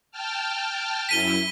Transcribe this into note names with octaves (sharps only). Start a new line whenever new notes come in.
G5 A5 F6
F#2 E4 B6 D#7 G7